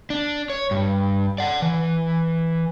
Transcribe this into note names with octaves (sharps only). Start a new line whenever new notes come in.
D4
C#5
G2
D5 F#5
E3